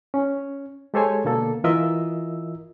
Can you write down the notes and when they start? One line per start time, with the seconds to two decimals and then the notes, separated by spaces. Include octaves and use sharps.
0.14 C#4
0.94 G#3 G4 A4 C5 C#5 G#5
1.25 B2 D3 A#3 A4
1.64 E3 F4 A#4 D#5 E5 E6